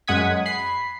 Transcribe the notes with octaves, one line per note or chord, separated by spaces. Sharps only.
F#2 G#3 F#5 D#6 G#6 B6
B5 C7